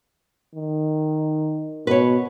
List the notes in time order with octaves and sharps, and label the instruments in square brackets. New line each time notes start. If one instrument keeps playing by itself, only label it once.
[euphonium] D#3
[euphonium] B2 [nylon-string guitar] B4 C#5